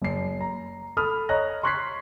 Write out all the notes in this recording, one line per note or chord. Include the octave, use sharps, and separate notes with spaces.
F#1 C7
A#5
A4 B5 D#6 F6
C#5 D#5 A#5 F#6 A#6
C6 C#6 F#6 G#6 B6 C7